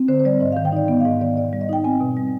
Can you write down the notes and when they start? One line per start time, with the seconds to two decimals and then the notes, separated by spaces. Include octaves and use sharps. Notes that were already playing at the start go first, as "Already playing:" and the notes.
Already playing: C4
0.08 D3 C5
0.20 C5
0.25 G3 D5
0.41 G#2 D#5
0.52 D#3 F5
0.65 G5
0.72 D#4 D5
0.88 B3 D#5
1.00 F5
1.05 G#2 D#5
1.21 D#3 D5
1.37 B2 D5
1.49 G3 D5
1.61 D#5
1.69 D#4 G5
1.84 C4 G#5
2.01 B2
2.17 G3